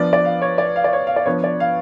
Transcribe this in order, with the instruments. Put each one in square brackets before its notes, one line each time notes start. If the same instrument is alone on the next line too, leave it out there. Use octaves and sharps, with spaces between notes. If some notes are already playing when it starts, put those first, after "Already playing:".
Already playing: [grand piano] F3 B3 D4 D5
D5
F5
C#5
D5
F5
D5
C#5
F5
D5
F3 B3 D4 C#5
D5
F5